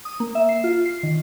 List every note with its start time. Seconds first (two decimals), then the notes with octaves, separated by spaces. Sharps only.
0.05 D#6
0.20 A#3
0.35 E5
0.49 C7
0.64 F4
0.85 C7
1.03 D#3